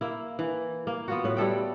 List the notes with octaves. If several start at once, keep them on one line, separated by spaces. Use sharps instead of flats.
A#3 E4
E3
A#3
B3 F4 F#4
A2 B4
G3 E4 A4 G5